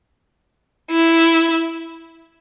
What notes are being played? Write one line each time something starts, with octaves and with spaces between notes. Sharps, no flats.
E4